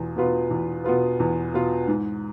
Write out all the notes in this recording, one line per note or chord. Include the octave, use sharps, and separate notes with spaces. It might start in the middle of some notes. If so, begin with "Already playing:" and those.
Already playing: E2 B2 F4
B2 B3 F4 B4
E2
B2 B3 F4 B4
E2
B2 B3 F4 B4
G#2